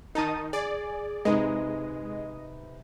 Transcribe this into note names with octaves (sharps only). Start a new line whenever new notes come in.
D#3 D#4 A#4 A5 D#6
G#4 D5
C3 G#3 D#4 B4 D#5